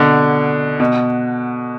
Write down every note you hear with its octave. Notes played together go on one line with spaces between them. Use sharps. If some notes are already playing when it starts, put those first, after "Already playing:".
Already playing: B2 D3
B2